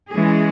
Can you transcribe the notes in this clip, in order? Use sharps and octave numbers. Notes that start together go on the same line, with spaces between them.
E3 G#3 C#4 G#4